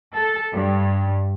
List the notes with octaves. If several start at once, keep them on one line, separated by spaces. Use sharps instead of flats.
A4
G2